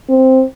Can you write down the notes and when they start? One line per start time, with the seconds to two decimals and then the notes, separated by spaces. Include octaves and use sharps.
0.09 C4